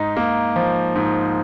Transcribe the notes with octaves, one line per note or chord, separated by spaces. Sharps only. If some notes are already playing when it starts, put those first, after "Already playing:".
Already playing: G#2 D#4
A#3
F3
G#2